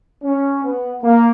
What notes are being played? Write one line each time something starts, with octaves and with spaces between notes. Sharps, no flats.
C#4
B3
A#3